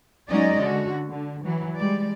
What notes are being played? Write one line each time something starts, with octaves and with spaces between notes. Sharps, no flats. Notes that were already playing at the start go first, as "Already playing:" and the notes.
F#3 G#3 C#4 D#4 D5 D#5
D3 F#4
D3
E3 F#3
G3 G#3 D5